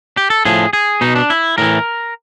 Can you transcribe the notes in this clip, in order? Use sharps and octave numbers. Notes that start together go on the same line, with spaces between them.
G4
A4
A2 F3 G#4
G#4
B2 D#4
D4
E4
A2 E3 A#4